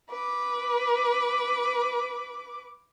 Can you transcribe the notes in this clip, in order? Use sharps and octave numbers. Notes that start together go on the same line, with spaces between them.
B4 D6